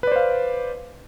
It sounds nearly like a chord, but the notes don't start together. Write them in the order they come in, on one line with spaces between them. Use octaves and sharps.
B4 D5 C5 F5